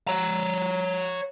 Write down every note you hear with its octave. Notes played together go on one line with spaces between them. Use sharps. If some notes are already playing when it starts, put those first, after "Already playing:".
C#5 A#5